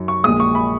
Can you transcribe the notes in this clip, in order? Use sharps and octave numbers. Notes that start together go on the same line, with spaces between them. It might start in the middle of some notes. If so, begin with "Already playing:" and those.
Already playing: F#2 D#4
C#6
A#1 A#2 G#3 D#6
C#6
B5